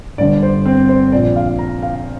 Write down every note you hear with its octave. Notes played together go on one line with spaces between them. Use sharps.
G1 G2 D3 D5
C5
C4
C5
A#1 A#2 D5
F5
A#5
F5